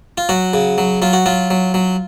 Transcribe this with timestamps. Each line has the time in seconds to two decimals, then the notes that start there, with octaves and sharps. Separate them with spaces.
0.18 F4
0.29 F#3 F#4
0.53 C#3
0.78 F#3
1.02 F#3 F4
1.13 F#4
1.26 F#3 F4
1.50 F#3
1.74 F#3